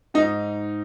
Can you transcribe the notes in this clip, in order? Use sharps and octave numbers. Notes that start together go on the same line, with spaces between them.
G#2 D#4